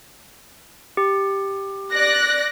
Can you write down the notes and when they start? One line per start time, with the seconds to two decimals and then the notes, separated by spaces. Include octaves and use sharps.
0.97 G4
1.92 D5 F#6 A#6